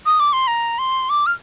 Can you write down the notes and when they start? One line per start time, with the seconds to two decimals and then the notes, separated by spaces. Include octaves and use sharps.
0.06 D#6
0.20 D6
0.33 C6
0.47 A#5
0.79 C6
1.10 D6
1.26 F6